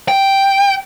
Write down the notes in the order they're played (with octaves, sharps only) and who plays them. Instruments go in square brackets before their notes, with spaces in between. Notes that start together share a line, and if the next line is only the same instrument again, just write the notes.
[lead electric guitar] G5